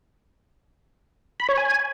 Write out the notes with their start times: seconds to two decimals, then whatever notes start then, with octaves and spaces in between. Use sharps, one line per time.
1.40 B5
1.49 C#5
1.57 G#5